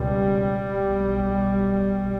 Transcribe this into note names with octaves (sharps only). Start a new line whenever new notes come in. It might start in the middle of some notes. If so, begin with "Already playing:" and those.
Already playing: C#2 B2 G3
B1 B2